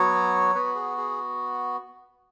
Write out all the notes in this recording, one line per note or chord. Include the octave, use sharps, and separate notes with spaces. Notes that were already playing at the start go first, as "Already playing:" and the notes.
Already playing: F#3 B3 F#4 C#5
B3 F#4 B4
G#4
G#4